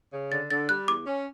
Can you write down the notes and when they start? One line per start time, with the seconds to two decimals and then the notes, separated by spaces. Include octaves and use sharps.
0.13 C#3
0.32 D3 A6
0.50 D3 A6
0.69 G3 F#6
0.88 E2 D6
1.06 C#4